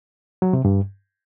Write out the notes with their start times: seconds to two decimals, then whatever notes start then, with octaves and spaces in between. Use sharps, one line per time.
0.42 F#3
0.53 C3
0.65 G2